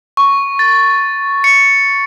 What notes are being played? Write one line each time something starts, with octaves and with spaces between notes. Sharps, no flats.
C#6
A6
C#7